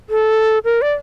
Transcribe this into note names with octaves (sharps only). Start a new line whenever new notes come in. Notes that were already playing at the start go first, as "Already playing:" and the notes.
A4
A#4
D5